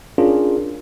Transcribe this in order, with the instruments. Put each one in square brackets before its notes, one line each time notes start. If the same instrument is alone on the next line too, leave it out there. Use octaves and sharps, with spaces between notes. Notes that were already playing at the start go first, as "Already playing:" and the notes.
[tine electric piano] C#4 D4 F4 G#4 A#4